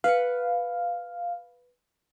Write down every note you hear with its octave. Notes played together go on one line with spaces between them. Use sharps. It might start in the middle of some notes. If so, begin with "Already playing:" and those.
B4 F5 F#5